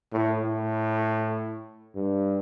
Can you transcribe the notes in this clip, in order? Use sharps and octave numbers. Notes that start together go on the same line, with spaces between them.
A2
A2
G2